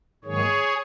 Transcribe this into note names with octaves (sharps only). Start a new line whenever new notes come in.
G#2 D#3 F#3 A#3 G#4 C#5